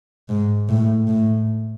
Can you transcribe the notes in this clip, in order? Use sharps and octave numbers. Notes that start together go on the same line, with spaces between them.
G#2
A2
A2